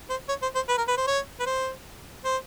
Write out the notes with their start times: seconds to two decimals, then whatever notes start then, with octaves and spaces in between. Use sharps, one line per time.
0.10 C5
0.29 C#5
0.42 C5
0.55 C5
0.69 B4
0.78 A#4
0.88 B4
0.97 C5
1.07 C#5
1.40 B4
1.46 C5
2.25 C5